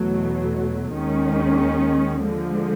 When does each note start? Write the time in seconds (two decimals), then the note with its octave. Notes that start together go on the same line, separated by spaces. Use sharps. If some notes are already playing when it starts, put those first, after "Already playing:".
Already playing: E2 B2 F#3 A3
0.94 D#2 D#3 G#3 C#4
2.25 D3 F3 G#3